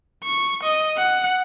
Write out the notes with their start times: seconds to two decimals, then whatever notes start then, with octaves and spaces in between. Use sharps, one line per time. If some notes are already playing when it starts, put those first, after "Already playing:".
0.24 C#6
0.63 D#5
0.97 F#5